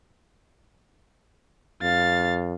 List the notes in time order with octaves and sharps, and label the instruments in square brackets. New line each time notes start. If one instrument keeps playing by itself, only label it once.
[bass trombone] F2 [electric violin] F5 A6